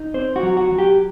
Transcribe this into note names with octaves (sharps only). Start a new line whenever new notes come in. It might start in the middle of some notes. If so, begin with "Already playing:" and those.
Already playing: D#4
C4 C5
F#4
F#3
F#4
F#3
G4